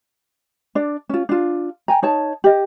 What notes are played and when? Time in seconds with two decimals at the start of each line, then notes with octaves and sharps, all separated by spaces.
0.75 D4 D5
1.09 C#4 F4
1.29 D4 F4
1.88 G5 G#5 A#5
2.03 D#4 C#5 A5
2.44 G4 D#5